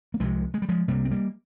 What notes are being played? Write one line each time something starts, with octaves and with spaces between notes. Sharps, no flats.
A#3
C2 C3 F3 G#3
G#3
G3
F3 G#3
C2 C3 G3 A#3
C4
G3 A#3